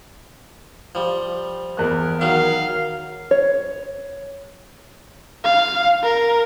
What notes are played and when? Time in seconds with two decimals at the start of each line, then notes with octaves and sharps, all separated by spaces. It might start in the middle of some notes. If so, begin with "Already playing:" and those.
0.95 F3 G3
1.77 E2 A#4 F#6
2.21 D#3 F#3 F5 C#6
3.31 C#5
5.44 F5
6.03 A#4